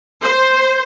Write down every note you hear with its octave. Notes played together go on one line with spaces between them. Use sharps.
C5